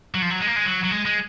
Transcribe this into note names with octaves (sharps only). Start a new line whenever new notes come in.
F#3
F3
F#3
G#3
A#3
G#3
F#3
F#3
G#3
G#3